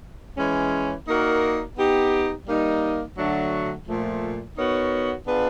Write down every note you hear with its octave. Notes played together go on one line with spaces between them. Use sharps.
E3 G#3 C#4
A#3 D#4 F#4 A#4 D5
B3 D#4 G4
G3 A#3 D#4
D3 F#3 A3 D4 F#4
A#2 F3 A3
B3 D#4 F#4 A#4 C#5
B3 D4 F4 G#4 B4